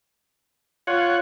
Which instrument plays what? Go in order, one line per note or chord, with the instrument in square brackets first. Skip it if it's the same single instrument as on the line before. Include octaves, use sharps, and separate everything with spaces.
[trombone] F4 [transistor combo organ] C#5 F#5